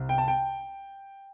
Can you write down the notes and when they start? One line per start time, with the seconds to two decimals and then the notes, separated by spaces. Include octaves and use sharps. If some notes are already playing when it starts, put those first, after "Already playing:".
Already playing: C2 C3
0.09 G5
0.18 A5
0.28 G5